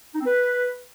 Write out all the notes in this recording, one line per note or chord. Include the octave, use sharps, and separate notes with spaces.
D#4
C4
B4